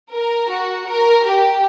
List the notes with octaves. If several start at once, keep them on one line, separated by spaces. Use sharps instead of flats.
A#4
F#4
A#4
G4